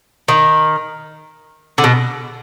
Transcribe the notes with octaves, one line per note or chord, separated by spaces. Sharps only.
D#3
D3
B2